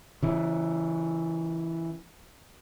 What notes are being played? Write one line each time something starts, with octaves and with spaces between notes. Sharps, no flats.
C#3 E3